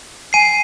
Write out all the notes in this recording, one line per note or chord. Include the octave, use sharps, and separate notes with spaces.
G#5 C7 D#7